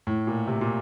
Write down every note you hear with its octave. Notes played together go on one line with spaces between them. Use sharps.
A2
A#2
C3
A#2